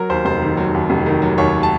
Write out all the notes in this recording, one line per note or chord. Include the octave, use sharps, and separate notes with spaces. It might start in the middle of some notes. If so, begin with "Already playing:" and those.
Already playing: F#3 A#4
D#2 C5
F1 C5
D#3
F#3
D#2
F1
D#3
F#3
D#2 C#5
A5